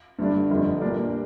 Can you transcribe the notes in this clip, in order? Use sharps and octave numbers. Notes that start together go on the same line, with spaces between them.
G1 G2 D3 G3 D4
G1 F2 D3 F3
A#2 G3 D4 A#4